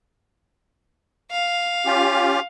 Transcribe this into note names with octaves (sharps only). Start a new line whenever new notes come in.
F5
C#4 F4 G4